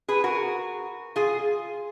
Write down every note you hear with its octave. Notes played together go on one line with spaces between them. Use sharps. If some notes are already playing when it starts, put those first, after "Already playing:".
G#4 B4
F#4 A#4
F4 G#4